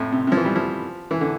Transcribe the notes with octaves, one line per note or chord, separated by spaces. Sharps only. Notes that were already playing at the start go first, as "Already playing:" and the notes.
Already playing: F2 A2
C3
C3
F3
E3
G3
F3
E3
D3